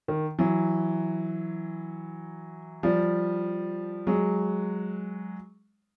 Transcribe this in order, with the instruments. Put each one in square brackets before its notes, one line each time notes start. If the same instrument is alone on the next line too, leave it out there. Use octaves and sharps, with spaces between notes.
[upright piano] D#3
E3 F#3
F3 G3
F#3 G#3